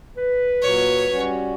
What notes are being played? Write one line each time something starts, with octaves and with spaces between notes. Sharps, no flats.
B4
A#2 F#3 C#5
G3 C#4 F#4